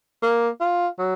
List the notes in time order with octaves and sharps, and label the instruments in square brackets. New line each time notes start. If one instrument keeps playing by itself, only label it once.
[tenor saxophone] A#3
F4
F#3